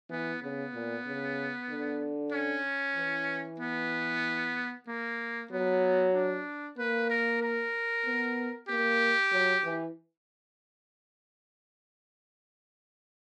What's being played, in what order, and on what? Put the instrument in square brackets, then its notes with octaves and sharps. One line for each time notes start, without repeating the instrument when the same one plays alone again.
[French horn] E3 [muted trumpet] B3
[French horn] C#3 [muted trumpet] B3
[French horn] A#2
C#3
D3
[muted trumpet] C#4
[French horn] E3
[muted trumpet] B3
A#3
[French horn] F#3 [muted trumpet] B3
[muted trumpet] D4
[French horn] A#3 [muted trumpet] B4
[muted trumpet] A#4
A#4
[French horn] B3
[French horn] A#3 [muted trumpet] G4
[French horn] F#3
E3